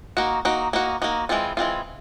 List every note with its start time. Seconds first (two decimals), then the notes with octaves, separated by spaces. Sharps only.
0.17 A#3 D#4 F#4
0.45 A#3 D#4 F#4
0.73 A#3 D#4 F#4
1.02 A#3 D#4 F#4
1.29 E3 G#3 C4 F4
1.57 E3 G#3 C4 F4